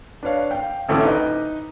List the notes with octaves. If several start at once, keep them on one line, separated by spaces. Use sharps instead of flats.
D4 B4 C#5 F5
F5 G5
A1 D2 A3 C4 D6
D#4 B4 D#5